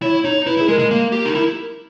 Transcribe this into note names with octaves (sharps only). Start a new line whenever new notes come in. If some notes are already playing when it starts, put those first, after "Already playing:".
E4 C#5
D#4 C#5
E4 B4
E4
G#4
G#3 A#4
G#3
A#3
G4
D#4
E4